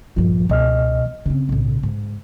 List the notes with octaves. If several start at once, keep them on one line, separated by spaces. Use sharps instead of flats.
A#1 G2 F3
C#2 B2 D#5 F6
C#3 C4 D4
B1 A2
G#2